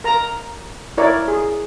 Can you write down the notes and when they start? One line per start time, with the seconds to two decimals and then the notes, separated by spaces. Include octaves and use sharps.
0.04 A#4 A#5
0.98 E4 A#4 C#5 D5
1.28 G#4